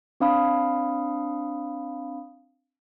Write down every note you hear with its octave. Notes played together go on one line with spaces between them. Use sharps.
C4 D4 F5 B5 D#6